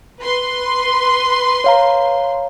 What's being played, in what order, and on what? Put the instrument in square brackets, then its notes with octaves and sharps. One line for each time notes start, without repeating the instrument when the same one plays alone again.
[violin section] B4 C6
[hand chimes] C#5 F5 A#5